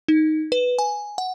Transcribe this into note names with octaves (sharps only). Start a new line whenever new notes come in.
D#4
B4
G#5
F#5